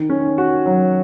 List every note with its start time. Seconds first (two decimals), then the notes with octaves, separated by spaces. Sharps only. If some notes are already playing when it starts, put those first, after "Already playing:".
Already playing: D#3
0.09 C#4
0.38 F#4
0.66 F#3